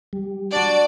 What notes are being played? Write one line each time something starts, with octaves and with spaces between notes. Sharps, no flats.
G3
D4 F#4 D5